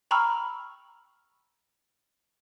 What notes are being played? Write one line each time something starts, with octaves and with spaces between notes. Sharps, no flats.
G5 A#5 B5 C#6 E6 F6